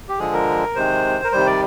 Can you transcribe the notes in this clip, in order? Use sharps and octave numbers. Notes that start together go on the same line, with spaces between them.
G4
D3 F3 G#3 G#4
A#4
C3 D#3 G#3 C5
A#4
C3 D#3 G3 C5
D5